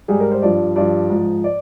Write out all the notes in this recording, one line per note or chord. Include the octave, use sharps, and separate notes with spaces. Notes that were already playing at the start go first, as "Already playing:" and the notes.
G#2 G3 G#4
A#4
C5
G2 F3 D5
G2 F3 D5
G#2 F3
D5